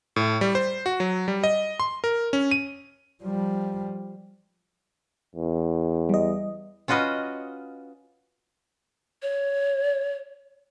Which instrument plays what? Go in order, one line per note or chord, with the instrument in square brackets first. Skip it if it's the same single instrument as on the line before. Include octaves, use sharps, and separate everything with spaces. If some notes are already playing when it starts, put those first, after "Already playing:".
[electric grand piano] A2
G3
C5
F#4
F#3
G3
D#5
C6
A#4
C#4
D#7
[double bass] F3 G3
[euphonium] E2
[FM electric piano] G3 D#5
[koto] C#4 F4 F#4 B4 D#5
[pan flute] C#5